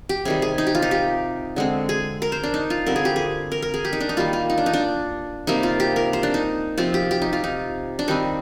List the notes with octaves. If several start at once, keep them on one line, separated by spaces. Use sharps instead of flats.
G4
C3 D#3 G3 G#4
G#4
D#4
G4
F4
D#4
G4
D3 G#3 C4
G#4
A#4
C5
D4
D#4
F4
D3 G3 C4 A#4
G#4
G4
G#4
A#4
A#4
G#4
G4
D#4
D4
D#4
D#3 G3 A#3 F4
F4
D#4
D4
D#4
D4
C3 G3 A#3 D#4
F4
G4
A#4
C5
D4
D#4
C3 F3 C4 F4
G4
G4
D#4
F4
D#4
D4
D#3 G3 C4 D#4